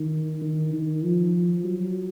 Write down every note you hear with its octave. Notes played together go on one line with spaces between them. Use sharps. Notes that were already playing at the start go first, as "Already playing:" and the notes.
Already playing: D#3
D#3
D#3
F3
F#3